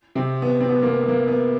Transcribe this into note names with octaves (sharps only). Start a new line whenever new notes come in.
C3 C4
B3
C4
B3
A#3
B3
B3
A#3
B3